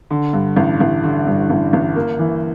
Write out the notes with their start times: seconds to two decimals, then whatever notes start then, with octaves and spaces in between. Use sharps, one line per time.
0.11 D3
0.33 G2
0.56 A1
0.80 A1
1.04 D3
1.27 G2
1.50 A1
1.73 A1
1.96 A#3
2.19 E3